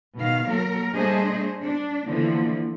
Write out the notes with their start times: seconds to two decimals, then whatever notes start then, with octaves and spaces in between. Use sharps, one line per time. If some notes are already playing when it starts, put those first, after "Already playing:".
0.16 B2 D#3 F5
0.47 F#3 A#3 A#4
0.94 G3 A3 D4 G#4 C5 D#5
1.61 D4
2.07 D3 E3 F3 A3 A#3